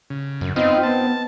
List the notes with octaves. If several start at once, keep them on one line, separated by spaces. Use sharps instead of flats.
C#3
F#2
B3 C4 D#4 F4 D#5
B3 A5